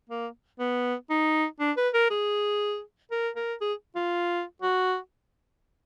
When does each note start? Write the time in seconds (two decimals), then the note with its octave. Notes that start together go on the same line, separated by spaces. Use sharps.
0.10 A#3
0.60 B3
1.10 D#4
1.60 D4
1.77 B4
1.94 A#4
2.11 G#4
3.11 A#4
3.36 A#4
3.61 G#4
3.96 F4
4.62 F#4